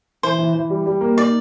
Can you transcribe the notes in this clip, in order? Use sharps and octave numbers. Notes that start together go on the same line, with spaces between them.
E3 C5
E3
E3
G3
G3
A#3
D#4 D5